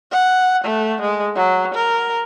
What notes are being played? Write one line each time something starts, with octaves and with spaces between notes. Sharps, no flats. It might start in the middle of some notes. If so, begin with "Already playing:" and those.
F#5
A3
G#3
F#3
A#4